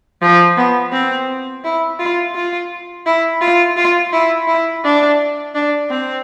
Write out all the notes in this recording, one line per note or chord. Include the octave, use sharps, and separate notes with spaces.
F3
B3
C4
E4
F4
F4
E4
F4
F4
E4
E4
D4
D4
C4